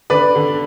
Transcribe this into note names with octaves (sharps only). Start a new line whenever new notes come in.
D3 B4 D5
D3